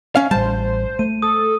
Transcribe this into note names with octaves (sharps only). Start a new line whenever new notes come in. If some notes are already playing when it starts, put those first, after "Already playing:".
C#4 F5
A1 G3 C5 A5
A3 D#7
A4 D#6